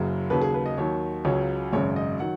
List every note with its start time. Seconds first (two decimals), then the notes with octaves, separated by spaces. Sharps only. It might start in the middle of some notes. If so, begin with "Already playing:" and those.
Already playing: F#1 F#2 C#3 F#3
0.30 D#2 C#3 F#3 B4
0.42 G#4
0.54 B4
0.66 D#5
0.77 D#2 D#3 F#3 C#5
1.25 C#2 C#3 F#3 C#5
1.73 G#1 F#2 C#3 F#3 C#5
1.96 D#5
2.20 D#3 F#3 F#5